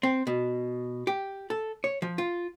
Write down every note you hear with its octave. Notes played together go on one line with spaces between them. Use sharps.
C4
B2
G4
A4
C#5
F3
F4